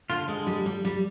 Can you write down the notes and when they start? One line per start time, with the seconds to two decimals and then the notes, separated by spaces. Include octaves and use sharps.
0.10 D3 F4
0.28 D3 G#3
0.47 G3
0.66 G3
0.85 G3